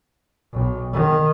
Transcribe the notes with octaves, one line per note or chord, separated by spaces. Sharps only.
B1
D#3